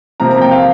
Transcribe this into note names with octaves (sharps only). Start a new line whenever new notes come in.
C3 F3 A#3 A#5
A#5
G5
F5